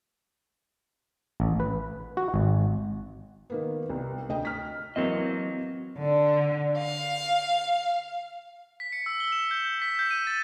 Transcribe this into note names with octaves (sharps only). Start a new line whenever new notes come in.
A1
B4
F#4
G#1
D#3 A#3 B3
C2
D2 D#5 G5
F6 B6
E3 F#3 A#3 C4 D#5
D3
F5
B6
C#7
E6
G7
E7
G6
G6
B6
G6
D#7
A6